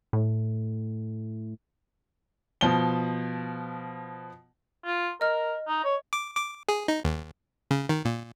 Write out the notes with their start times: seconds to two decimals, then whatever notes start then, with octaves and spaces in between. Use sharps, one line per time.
0.13 A2
2.61 B2 F3 G7
4.85 F4
5.21 A#4 D#5 F6
5.68 D#4
5.84 C#5
6.13 D6
6.37 D6
6.69 G#4
6.88 D#4
7.05 D#2
7.71 C#3
7.89 D#3
8.05 A#2